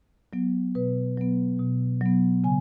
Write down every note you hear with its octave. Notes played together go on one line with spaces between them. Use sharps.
F#3 B3
B2 B4
F#3 B3
B2
F#3 B3
C#3 G#5